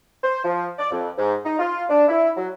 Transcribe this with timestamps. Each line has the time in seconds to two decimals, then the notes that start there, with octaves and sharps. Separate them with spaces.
0.24 C5
0.45 F3
0.79 D5
0.91 F2
1.18 G#2
1.45 D#4
1.59 F4
1.89 D4
2.08 E4
2.37 F#3